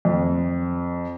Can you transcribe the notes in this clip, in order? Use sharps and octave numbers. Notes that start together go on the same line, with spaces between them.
F2